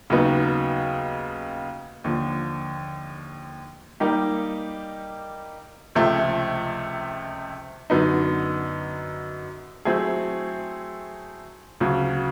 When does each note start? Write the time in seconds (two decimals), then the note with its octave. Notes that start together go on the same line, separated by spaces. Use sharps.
0.10 D#2 C#3 F#3 B3 D#4
2.04 D#2 D3 F3
4.00 G3 A#3 D#4 G4
5.95 C#2 C3 F3 A3
7.90 F#2 D3 F#3 B3 D#4
9.85 F#3 A3 C4 E4 G#4
11.81 D2 C#3 F#3